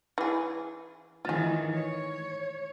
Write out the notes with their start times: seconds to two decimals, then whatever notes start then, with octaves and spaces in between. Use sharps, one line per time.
0.18 E3 G#4
1.25 D#3 E3 F4 G#4
1.73 C#5